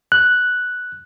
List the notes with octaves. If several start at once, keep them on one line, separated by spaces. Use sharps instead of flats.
F#6